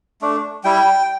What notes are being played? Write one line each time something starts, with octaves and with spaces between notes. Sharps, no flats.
A3 D4
G3 E4 G5